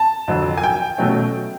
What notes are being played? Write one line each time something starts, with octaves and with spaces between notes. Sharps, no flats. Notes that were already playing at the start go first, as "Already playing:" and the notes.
Already playing: A5
F2 D3 F#3
G#5
G5
B2 F#3 A3 C#4